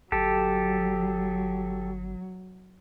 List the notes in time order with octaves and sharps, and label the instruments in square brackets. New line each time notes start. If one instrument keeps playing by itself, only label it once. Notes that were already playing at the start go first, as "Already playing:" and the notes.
[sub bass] G1 [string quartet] F#3 [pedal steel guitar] G4 A4